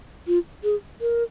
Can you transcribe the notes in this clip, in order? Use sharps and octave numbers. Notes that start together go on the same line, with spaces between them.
F4
G#4
A#4